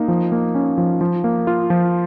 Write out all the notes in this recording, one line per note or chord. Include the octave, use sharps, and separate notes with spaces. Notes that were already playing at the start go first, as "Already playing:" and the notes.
Already playing: A#3 D#4
F3
A#3
C#4
F3
F3
A#3
F4
F3